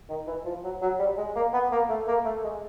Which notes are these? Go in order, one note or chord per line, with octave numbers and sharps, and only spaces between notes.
D#3
E3
F3
F#3
F#3
G3
G#3
A#3
B3
A#3
A3
A#3
A3
G#3